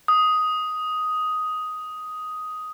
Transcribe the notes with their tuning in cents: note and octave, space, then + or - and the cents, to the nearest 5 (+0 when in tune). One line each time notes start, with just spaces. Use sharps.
D#6 +5